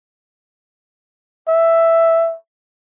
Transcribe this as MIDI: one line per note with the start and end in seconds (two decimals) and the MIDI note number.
1.48 2.35 76